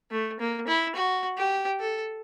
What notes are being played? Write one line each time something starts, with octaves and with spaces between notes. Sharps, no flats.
A3
A#3
E4
F#4
G4
A4